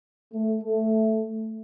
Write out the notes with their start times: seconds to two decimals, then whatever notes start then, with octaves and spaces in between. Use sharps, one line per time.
0.33 A3
0.61 A3